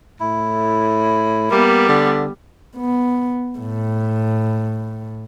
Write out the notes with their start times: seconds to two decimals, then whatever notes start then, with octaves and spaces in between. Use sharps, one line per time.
0.20 A2 E4
1.51 G3 A#3 B3
1.89 D3
2.76 B3
3.58 A2